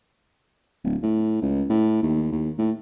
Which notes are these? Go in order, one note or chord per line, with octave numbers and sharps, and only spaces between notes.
D1
A2
C#2
A2
D#2
D#2
A2